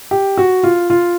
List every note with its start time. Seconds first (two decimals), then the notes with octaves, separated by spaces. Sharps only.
0.11 G4
0.38 F#4
0.63 F4
0.90 F4